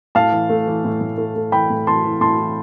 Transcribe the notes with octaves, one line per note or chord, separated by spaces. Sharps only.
A2 F5 A5
E3
A3
E3
A2
A2
A3
A3
E3 G5 B5
A2
E3 A5 C6
E3
A2 A5 C6
E3